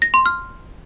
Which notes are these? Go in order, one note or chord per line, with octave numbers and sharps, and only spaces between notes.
A#6
C6
F6